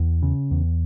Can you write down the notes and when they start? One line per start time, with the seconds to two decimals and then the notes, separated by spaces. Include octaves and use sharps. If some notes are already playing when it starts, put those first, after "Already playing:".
Already playing: E2
0.22 C#3
0.51 E2